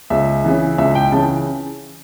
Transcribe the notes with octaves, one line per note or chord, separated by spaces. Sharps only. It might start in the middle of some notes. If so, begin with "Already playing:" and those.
C#2 E5
C#3 E3
C#2 E5
G5
C#3 E3 A5